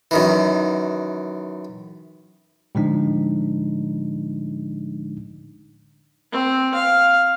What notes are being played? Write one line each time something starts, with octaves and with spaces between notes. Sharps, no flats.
F#2 D#3 E3
A2 D3 F3 G#3 D4 D#4
C4
F5